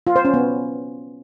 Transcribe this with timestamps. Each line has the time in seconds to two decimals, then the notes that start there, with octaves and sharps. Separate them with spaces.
0.07 F4
0.16 C5
0.25 C#4
0.34 B3